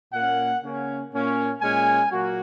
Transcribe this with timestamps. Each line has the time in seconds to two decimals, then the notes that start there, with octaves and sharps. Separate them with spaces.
0.13 A#2 A#3 C#4 F#5
0.63 C#3 A#3 C#4
1.12 A#2 A#3 C#4
1.62 A#2 G#3 C#4 G#5
2.11 A#2 F#3 A#3 F#4